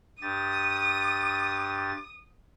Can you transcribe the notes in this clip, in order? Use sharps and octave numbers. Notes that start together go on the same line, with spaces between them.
G2 G4 D#6 A6